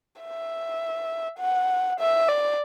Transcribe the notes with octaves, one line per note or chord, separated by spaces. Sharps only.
E5
F#5
E5
D5